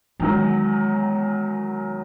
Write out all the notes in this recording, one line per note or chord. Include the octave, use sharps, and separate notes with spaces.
E2 D#3 F#3 G#3